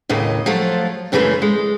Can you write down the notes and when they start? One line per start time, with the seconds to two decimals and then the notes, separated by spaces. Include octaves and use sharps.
0.09 D#2 A2 C#3 D#5
0.46 F3 F#3 A3 F4
1.12 F#2 C#3 E3 G#3 A3 C#4
1.42 G#3